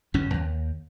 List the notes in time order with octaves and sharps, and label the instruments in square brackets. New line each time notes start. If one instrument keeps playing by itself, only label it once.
[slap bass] G1 F#2 C#4
D#2